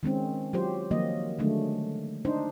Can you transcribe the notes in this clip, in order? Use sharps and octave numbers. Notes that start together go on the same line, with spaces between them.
D#3 G#3 C4 C#4
F#3 F4 G4 C5
D#3 F3 F#3 A#3 F#4 D#5
D3 D#3 F#3 G#3 A3 D4
D4 D#4 C5